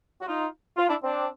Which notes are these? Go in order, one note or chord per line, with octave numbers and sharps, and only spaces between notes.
F#4
D#4 F4
F4
D4 E4
C4 D4